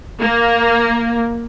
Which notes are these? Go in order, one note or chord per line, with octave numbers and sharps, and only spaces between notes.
A#3